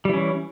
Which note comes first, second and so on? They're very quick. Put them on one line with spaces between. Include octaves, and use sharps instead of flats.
G3 E3 C#4